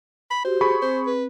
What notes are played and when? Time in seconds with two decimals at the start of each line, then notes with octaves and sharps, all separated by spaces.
0.30 B5
0.45 F#4 G4 C5
0.61 G#4 B5 C#6
0.82 C4 C5
1.07 B4